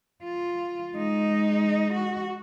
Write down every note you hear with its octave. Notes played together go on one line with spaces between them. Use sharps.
F4
G#3 D#4
F#4